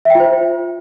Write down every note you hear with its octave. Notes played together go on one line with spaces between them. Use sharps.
F4 C5 E5 G5